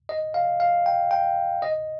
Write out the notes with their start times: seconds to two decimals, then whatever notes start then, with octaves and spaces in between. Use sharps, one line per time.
0.09 D#5
0.34 F5
0.60 F5
0.86 G5
1.11 G5
1.62 D#5